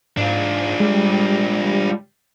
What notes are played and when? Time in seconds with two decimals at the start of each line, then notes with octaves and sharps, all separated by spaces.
0.17 G#2 D4 F4
0.80 G3 G#3